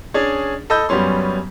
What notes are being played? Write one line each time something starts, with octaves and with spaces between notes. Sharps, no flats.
C#4 D4 G#4 D5
A4 D#5 B5 E6 G6
F#2 G3 B3 C#4 C6